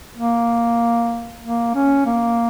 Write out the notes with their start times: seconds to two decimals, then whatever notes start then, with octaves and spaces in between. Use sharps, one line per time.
0.17 A#3
1.43 A#3
1.75 C#4
2.06 A#3